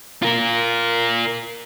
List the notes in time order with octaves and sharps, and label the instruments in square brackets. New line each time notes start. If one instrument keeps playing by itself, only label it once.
[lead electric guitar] F4 A#4